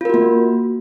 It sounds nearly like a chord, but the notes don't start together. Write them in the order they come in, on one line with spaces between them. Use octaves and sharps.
F4 A#4 F#4 A#3